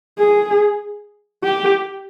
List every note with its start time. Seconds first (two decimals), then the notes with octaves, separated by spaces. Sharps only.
0.19 G#4
1.44 G4